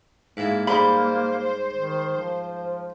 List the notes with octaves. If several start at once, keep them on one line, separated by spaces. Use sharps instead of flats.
G#2 A#3 E4 F5
G#2 G3 C5 B5 C6
D#3
F3